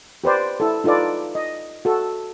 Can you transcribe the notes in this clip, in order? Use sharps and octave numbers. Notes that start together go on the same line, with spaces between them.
G4 B4 C5 D5
E4 A4
D#4 F4 A4 B4 D5
D#5
F#4 A4